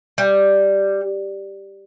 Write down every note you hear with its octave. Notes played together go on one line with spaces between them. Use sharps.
G3